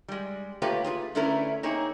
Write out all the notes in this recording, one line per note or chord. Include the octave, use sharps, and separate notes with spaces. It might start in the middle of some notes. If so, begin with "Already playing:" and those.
G3 G#3
A3 A#3 F4 G4 B4 C#5
F4 G#4 B4
D3 A3 C#4 E4 A#4 B4
A#3 C4 D#4 G#4 C#5